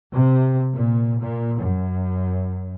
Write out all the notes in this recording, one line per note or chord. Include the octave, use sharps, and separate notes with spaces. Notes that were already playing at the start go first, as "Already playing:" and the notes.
C3
A#2
A#2
F#2